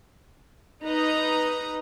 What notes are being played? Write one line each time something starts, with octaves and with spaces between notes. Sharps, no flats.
D#4 B4 D#5 A#5